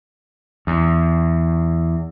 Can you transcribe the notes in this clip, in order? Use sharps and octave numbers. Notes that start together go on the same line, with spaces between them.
E2